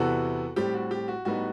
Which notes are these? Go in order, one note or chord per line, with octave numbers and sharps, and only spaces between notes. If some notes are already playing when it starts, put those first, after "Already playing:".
Already playing: E2 C3 E3 B3 F#4 A4
A2 G3 C4 G4
F#4
G4
F#4
A2 G3 B3 D#4 F#4